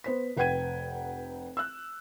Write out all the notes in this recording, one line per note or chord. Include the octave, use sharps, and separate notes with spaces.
B3 C5 B6
F1 B4 F#5 G5 G#6 D#7
E6 F#6